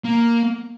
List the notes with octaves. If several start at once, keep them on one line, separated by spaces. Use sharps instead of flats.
A#3